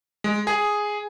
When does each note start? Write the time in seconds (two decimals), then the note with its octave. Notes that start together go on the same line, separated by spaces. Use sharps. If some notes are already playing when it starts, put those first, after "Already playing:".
0.24 G#3
0.47 G#4